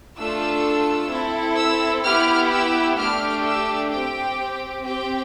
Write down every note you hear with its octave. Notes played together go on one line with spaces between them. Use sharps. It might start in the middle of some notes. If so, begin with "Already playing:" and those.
A3 D4 F4 A4 E6
C4 E4 A4
E6
B3 E4 G4 F6
E6
A3 D4 G4 F6
E6
C4 G4 G5
C4 G4 G5